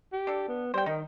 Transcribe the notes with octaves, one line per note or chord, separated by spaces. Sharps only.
G4
D4 A4
B3
G3 C5 G5
D#3 D#4